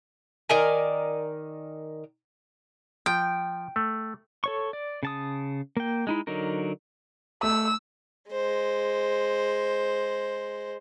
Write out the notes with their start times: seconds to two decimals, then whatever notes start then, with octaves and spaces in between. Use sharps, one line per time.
0.49 D#3 A#4 D5 G#5
3.06 F3 G5
3.76 A3
4.44 A4 C#5 C#6
4.73 D5
5.03 C#3 A5 D#6
5.77 A#3 G5
6.07 G#3 D#4 E4
6.27 D3 F#3 D#4 A#4
7.43 A3 E6
8.31 G#3 C5